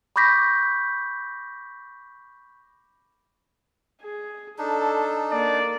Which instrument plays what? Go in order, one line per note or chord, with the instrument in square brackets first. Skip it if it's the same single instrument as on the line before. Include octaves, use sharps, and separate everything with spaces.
[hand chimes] B5 C#6 D6 G6 A#6 B6
[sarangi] G#4
[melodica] D4 D#4 [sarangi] A4
[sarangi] A#3 [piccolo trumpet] D5